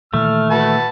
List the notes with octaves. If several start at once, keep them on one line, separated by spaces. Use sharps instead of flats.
A#2 D#3 E3 A3 F6
F#4 B4 A5